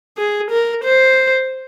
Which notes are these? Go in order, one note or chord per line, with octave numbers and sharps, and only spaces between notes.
G#4
A#4
C5